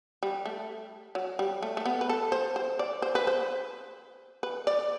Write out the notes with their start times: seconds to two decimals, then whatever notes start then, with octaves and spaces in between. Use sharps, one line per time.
0.23 G3
0.45 A3
1.15 F#3
1.39 G3
1.62 A3
1.77 A3
1.86 B3
2.01 B4
2.09 A4
2.32 C5
2.56 C5
2.79 D5
3.02 C5
3.15 B4
3.27 C5
4.43 B4
4.67 D5